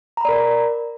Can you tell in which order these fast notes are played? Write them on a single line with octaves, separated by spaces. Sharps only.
A#5 B5 D5 A#4